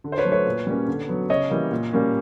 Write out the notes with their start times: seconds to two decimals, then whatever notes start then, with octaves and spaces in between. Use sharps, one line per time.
0.04 D3
0.12 C5
0.18 B4 C#5
0.25 F#3 A3
0.32 B4 C#5
0.46 A#2
0.67 G3 A#3 C#4
0.88 D3
1.08 F#3 B3
1.30 C#3 C#5 D#5
1.50 E3 G3 A#3
1.72 A#2
1.93 G3 A#3 C#4